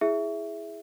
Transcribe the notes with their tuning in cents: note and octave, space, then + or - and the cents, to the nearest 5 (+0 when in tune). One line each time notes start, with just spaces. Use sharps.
E4 +0 G#4 +0 E5 +0